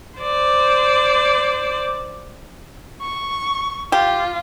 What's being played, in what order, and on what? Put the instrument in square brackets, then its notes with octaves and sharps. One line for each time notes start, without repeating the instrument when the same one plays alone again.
[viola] C5 D5
[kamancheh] C#6
[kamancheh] F4 [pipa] G4